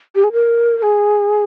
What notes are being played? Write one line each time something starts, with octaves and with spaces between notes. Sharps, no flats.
G4
G#4
A#4
A#4
G#4